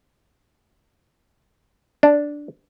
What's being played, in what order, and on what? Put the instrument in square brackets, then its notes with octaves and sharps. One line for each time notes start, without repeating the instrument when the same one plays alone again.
[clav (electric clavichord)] D4